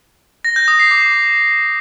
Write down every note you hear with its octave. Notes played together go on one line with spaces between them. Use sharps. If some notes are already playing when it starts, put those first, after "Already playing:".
A#6
G6
D#6
C7
D6